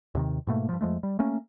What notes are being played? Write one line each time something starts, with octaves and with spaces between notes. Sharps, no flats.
D#2 C3 D#3
G#2 B2 A3 A#3
G2 F3
F2 F3 G#3 A3
G3
A3 A#3 C#4